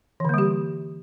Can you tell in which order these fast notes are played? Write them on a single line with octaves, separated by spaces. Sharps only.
E3 D3 A#3 G3 G4